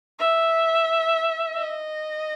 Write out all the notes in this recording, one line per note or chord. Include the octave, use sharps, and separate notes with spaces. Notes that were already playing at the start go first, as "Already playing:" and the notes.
E5
D#5